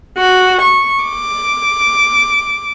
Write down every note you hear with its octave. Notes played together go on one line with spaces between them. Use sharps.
F#4
C#6
D6